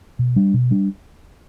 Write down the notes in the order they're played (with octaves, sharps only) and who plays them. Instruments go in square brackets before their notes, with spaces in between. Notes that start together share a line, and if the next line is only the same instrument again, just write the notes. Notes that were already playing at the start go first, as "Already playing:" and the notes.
[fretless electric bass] B2
G3 D4
B2
G3 D4